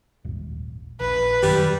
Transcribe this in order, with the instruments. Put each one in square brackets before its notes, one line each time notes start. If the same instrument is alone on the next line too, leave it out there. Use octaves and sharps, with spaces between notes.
[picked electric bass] D#1 G#1
[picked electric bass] A#1 [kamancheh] B4
[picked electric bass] F#2 D#3 [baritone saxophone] G3